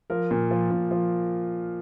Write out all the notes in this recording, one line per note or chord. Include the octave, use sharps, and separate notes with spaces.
F3 A#4
A#2
F3
A#2
F3